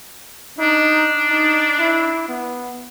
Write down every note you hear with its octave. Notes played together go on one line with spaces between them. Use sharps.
D4 D#4
D#4
E4
B3